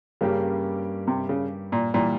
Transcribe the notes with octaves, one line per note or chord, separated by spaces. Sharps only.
G2 C#3 G3 A#3 C#4 G4
C3
C#3
A#2
A#2 E3 G3